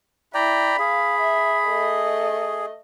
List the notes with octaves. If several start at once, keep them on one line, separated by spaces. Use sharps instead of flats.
E4 D5 G5 A#5 B5
G#4 F5
E5
A3 D#5